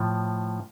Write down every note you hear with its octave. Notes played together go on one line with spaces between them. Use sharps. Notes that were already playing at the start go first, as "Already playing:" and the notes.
Already playing: A2 F3